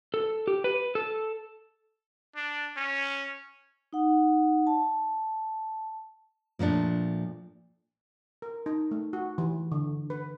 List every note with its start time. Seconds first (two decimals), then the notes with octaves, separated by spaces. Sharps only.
0.14 A4
0.48 G4
0.64 B4
0.95 A4
2.36 D4
2.77 C#4
3.93 D#4 F#5
4.67 A5
6.59 A#2 F3 A3 D4
8.42 A#4
8.66 D#4
8.91 A3
9.13 F#4
9.38 E3
9.72 D3
10.10 B4